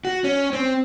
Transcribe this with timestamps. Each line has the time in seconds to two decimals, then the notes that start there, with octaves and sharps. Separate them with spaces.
0.05 F#4
0.24 C#4
0.53 C4